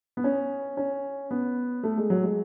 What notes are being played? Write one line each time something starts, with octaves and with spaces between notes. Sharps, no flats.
B3
C#4
C#4
B3
A3
G#3
F#3
G#3